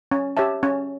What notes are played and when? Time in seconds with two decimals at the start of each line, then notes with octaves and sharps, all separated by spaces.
0.11 C#4
0.37 G4 C#5 E5 A5
0.63 C#4